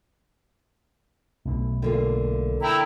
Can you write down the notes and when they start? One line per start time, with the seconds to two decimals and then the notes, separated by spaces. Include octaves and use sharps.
1.45 B1 B2 A3
1.82 D3 A#3 F4
2.62 E4 G5 A#5 E6